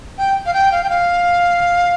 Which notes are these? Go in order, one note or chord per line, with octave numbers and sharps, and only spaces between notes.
G5
F5
G5
F5
G5
F5